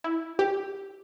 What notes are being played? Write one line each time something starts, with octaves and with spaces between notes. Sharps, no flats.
E4
G4